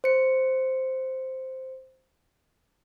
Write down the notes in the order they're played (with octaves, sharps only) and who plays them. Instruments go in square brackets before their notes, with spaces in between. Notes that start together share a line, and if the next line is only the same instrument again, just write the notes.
[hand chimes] C5 C#7